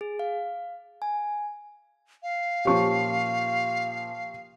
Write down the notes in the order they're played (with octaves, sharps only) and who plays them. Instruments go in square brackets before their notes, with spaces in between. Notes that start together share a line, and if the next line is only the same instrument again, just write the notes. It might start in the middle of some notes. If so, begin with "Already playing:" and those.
[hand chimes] G#4
F5
G#5
[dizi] F5
[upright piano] A#2 F3 C#4 [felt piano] G4 C#6